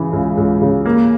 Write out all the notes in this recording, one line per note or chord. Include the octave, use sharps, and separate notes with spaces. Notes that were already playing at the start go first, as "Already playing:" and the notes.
Already playing: C#3 E3
C#2
C#2
C#3
A#3